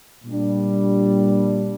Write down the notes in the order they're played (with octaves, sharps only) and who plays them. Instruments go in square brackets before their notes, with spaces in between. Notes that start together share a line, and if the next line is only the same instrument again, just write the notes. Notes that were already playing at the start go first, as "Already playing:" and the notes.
[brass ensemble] A#2 G3 D4